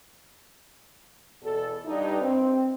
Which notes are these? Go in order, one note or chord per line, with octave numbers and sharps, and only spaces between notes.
E2 B2 A4
G2 D#4
C4